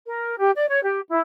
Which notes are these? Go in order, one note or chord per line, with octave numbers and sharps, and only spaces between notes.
A#4
G4
D5
C#5
G4
E4